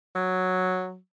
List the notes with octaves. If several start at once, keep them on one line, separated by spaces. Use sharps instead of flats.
F#3